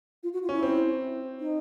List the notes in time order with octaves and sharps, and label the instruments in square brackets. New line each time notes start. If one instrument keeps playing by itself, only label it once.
[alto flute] F4
F#4
F4
[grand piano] C#4 [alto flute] E4
[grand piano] C4
[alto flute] D#4